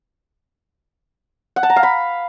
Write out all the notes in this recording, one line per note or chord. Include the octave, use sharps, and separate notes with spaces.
F#5
A5
A#5
F5
B5